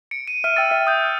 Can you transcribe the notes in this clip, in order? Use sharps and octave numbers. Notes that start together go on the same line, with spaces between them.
C#7 D7
D#7
E5 F6 D#7
G5 E6 F6 A6
E5
D#6 G6